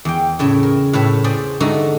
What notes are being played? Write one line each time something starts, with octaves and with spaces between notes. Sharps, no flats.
E2 G5
A2 C#3 E4 C#5
A#4
A2 B4 C#5 E5
G#4 C5 D5
D3 G#3 A3 D#4 F#4